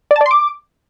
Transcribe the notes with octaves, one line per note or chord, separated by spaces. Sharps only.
D5
A5
D5
C6
D6